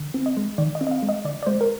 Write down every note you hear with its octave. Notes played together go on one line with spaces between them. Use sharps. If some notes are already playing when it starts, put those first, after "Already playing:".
Already playing: D3
C4
D#5
G#3
D#3 D5
D#5
C4
D#5
F5
G#3
D#5
D3 D5
D5
G#3 C5
A#4